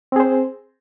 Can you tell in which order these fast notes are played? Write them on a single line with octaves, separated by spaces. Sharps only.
C4 G#4 C5